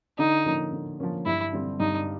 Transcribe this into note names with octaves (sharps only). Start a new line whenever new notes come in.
D3 D#4
F3 A#3 C#4
D3
F3 A#3 C#4
G2 E4
D3 G3 C4
G2 D#4